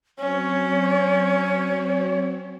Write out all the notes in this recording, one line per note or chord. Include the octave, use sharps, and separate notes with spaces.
F#3 C4 C#4 C#5